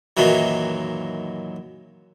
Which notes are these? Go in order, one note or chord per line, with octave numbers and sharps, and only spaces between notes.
F#2 A#2 D#3 E3 F#3